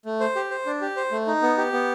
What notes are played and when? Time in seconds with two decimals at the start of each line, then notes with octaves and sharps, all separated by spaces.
0.05 A3
0.20 C5
0.36 G4
0.51 C5
0.66 D4
0.81 G4
0.97 C5
1.12 A3
1.27 D#4
1.42 B3
1.57 G4
1.73 B3